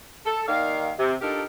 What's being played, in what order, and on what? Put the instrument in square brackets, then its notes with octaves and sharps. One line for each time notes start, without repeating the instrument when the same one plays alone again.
[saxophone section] A4
D#2 D#3 A#4 D5 F5
C3
D4 D#4 F4 G4 A4 A#4